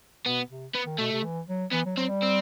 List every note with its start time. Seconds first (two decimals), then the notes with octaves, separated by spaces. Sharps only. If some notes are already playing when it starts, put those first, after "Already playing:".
0.25 B2 B3
0.50 C3
0.75 B3
0.86 D#3
0.98 B2 A3
1.12 C3
1.24 E3
1.49 F#3
1.73 E3 B3
1.86 F#3
1.97 F#3 C4
2.09 G3
2.22 C4